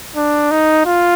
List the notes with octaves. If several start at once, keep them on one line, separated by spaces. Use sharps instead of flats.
D4
D#4
F4